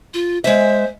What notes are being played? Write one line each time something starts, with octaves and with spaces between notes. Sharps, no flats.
F4
G#3 C5 E5